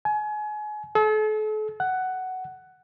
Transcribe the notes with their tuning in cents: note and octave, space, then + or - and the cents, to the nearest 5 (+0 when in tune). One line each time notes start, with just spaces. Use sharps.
G#5 +30
A4 -40
F#5 +10